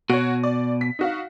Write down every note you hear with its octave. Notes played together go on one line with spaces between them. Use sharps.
B2 F#4 C#5
D5
B6
D#4 F#4 F5